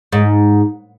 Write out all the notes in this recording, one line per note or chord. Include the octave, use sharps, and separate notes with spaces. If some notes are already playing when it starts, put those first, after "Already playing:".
G#2